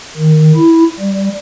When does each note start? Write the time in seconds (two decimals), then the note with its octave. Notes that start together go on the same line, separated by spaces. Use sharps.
0.17 D#3
0.55 E4
1.00 G3